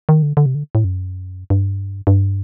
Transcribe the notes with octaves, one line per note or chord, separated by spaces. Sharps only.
D#3
D3
D3
C3
D3
A2
F#2
G2
G2